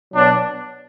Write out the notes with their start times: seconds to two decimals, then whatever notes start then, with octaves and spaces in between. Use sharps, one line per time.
0.13 B2 F#3 D4